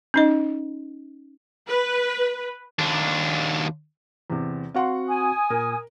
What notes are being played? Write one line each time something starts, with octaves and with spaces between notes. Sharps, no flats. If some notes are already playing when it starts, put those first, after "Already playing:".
C#4 D#4 D#5
B4
D#2 D4
E2 C3
C4 F#4 F5 F#5 C6
G#5 D#6
A#2 A#4